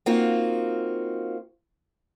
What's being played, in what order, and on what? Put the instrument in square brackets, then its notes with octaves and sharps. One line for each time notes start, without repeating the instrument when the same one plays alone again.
[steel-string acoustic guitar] A#3 C4 D#4 F4 F#4